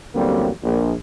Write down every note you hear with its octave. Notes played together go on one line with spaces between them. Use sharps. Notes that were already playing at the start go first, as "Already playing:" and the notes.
A1 D2 F#3 G3 A#3 C4
A#1